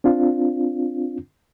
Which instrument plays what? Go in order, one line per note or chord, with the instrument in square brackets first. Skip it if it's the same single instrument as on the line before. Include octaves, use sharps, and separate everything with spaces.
[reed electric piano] C4 D4 F4